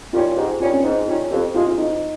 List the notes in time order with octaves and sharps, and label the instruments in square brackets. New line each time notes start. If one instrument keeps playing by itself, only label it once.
[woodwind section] D#3 G3 C#4 [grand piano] F4
[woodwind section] G#2 [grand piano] G4
[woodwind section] D#3 G3 C#4 [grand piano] F4
[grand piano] C#4
[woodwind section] G#2 [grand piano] D#4
[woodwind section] D#3 G3 C#4 [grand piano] F4
[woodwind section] F2 [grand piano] G4
[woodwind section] C3 F3 G#3 [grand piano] F4
[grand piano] F4
[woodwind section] F2 [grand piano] D#4